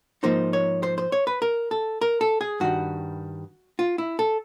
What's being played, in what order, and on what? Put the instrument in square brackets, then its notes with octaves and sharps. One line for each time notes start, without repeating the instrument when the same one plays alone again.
[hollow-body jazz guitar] G#2 F3 A#3 D#4 C5
C#5
C5
C5
C#5
B4
A#4
A4
A#4
A4
G#4
G2 D#3 G3 F#4
F4
E4
A4